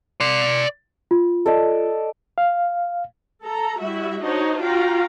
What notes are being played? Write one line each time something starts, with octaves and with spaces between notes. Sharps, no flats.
D5 C6
F4
A4 D5 D#5
F5
A4 A#5
G3 E4 F#4 E5
D4 D#4 F#4 C5 C#5 D#5
F4 F#4 F5 G5 A#5